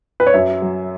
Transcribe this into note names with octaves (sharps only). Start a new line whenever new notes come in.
B4
C#5
F#2 E5
F#3